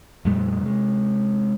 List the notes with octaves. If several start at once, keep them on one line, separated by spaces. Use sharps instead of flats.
F2 A#2 G3 A3
C3 G#3